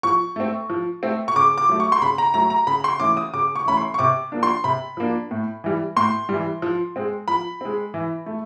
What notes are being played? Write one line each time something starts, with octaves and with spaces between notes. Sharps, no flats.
F3 C#6
A3 C4
F3
A3 C4
C#6
C#3 D6
D6
F#3 A3
C#6
C6
C#3 B5
A#5
F#3 A3 A#5
A#5
C#3 B5
C6
E3 A3 C#4 D6
D#6
C#3 D6
C#6
E3 A3 C#4 B5
C6
C#6
C3 D6
F3 A#3 D4
C6
C3 B5
F3 A#3 D4
A2
E3 G3
A2 C6
G3
E3
F3
G#3 C4
F3 B5
G#3 C4
E3
A3